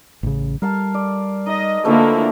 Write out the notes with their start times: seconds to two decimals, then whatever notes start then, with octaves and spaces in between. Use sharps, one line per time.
0.23 A1 C#3
0.62 G3 A#4 F5 A5
0.94 D5
1.46 D#4 D#5
1.85 D3 E3 F3 A3 A#3 E4